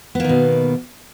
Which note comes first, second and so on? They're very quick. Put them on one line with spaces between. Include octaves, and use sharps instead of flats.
B3 A#3 D#3 B2